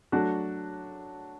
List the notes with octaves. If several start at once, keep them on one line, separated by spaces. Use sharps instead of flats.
F#3 A3 D4 F#4